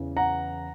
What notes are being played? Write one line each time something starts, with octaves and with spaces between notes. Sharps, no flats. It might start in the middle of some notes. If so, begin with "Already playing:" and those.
Already playing: E2 C#3 E3
F#5 A#5